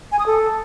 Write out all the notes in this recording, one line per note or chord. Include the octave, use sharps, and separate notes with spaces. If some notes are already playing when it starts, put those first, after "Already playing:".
G#5
D#6
A4